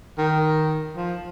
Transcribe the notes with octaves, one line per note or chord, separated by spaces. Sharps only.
D#3
F3